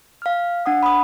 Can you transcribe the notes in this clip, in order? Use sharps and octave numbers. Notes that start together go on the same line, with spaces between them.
F5 F6
D4 F#5 D#6
B5 D#6